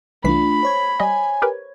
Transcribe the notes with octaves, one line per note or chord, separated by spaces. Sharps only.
C2 E3 A3 D4 F4 B5 B6
C5 C#5 G#6
G3 D#5 G#5
G4 A#4 B4